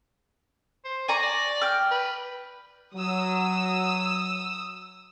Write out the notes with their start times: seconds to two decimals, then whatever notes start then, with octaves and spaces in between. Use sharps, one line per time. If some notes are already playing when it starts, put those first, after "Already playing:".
0.85 C5
1.08 D5 G#5 A#5 C#6
1.22 D5
1.62 G5 F6
1.91 B4
2.95 F#3 D#6 E6